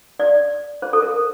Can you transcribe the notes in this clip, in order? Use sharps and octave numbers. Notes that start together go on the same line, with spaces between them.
D5
C5
A4
A#4